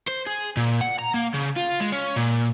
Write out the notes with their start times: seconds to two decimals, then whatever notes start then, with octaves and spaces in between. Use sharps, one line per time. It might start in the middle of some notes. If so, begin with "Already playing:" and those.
0.08 C5
0.27 G#4
0.57 A#2
0.81 F#5
0.99 A#5
1.14 A#3
1.34 C#3
1.56 F4
1.80 G#3
1.92 C#4
2.16 A#2